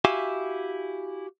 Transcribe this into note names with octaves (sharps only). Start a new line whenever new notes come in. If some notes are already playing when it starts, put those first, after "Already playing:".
E4 F#4 G4 E5 F5 G#5